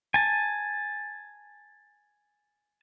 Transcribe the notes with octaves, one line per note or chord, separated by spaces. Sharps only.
G#5 A5